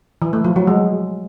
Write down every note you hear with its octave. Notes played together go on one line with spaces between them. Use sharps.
E3
A3
F3
F#3
G#3